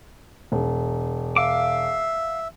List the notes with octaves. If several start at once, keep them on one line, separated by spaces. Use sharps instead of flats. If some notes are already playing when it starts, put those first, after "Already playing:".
E1
E5 F5 D6